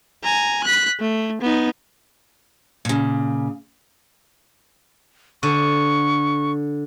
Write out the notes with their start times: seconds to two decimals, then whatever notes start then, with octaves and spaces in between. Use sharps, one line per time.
0.24 G#5 A#5
0.64 F#6 B6
1.00 A3
1.42 B3 D#4
2.85 A#2 C#3
5.43 D3 C#6